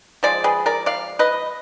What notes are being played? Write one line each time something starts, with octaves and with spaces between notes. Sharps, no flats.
F3 G#3 D5
G#4 B4
A#4 D5
D5 F5
B4 D#5